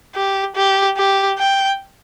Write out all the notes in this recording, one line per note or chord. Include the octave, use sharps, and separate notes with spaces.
G4
G4
G4
G5